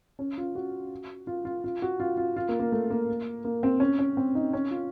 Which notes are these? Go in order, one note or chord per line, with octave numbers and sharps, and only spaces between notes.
C#4
F4
F#4
F4
F4
F4
F#4
F4
F4
F4
A#3
A#3
A3
A#3
A#3
C4
C#4
C#4
C4
D#4
C#4
F4